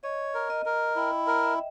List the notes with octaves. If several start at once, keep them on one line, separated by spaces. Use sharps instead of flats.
C#5 D#5
A#4
D#5
A#4
E4 G5
A#4
E5